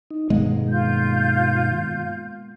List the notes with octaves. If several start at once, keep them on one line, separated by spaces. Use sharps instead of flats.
D#4
G2 B2 D#3 G#3 A#3 B3
F4 G6